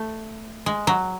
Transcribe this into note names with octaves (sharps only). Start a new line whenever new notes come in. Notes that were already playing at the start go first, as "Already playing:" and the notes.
Already playing: A3
G#3
F#3